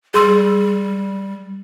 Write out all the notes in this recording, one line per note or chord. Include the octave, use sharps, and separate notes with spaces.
G3 G#4 C6 E6